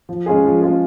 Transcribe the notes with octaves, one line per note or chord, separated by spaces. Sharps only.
F3
G#3 C#4 F4 G#4
F3
G#3 C#4 F4 G#4